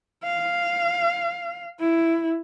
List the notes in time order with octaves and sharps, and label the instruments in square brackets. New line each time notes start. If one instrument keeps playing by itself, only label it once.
[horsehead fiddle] F5
E4